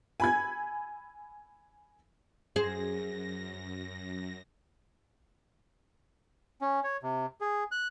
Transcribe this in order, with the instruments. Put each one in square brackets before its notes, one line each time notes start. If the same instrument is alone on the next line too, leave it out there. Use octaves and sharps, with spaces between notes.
[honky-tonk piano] G#5 B5 G#6
[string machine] F#2 A#6 [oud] G#4 C5
[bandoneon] C#4
C#5
C3
G#4
F#6